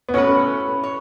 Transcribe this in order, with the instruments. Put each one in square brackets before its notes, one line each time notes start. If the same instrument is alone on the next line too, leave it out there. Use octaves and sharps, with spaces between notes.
[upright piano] B3
[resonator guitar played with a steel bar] A2 A3 F#4 B4 [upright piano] C#4
[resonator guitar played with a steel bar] C#5